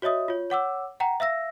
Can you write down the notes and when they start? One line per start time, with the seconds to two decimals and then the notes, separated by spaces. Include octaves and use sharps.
0.02 F#4 C#5 D#5 E5 D#6
0.28 F4 C#5
0.50 C#5 F#5 D6 E6
1.00 F#5 G5 A#5
1.20 E5 F5 E6 A#6